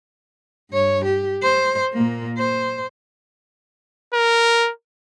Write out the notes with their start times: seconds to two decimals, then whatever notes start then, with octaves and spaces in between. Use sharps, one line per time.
0.71 G2 C#5
1.05 G4
1.43 C5
1.94 A#2 A#3
2.38 C5
4.14 A#4